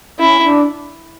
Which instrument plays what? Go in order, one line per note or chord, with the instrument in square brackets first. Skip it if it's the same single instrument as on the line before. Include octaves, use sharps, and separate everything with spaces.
[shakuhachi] C#4 [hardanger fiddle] E4
[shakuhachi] D4